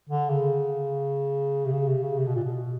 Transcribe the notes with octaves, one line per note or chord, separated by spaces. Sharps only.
D3
C#3
C3
C#3
C3
C#3
C3
B2
A#2
B2